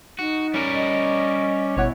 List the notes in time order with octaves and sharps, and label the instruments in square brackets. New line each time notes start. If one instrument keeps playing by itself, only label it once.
[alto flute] D#4 [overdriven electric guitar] F#4
[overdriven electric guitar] G3 A#4 [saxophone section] C#4
[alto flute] D#5
[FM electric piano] G1 B2 F#5 [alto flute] E4 [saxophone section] C#5